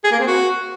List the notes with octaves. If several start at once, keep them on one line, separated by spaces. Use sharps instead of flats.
G#4
A#3
C4
F#4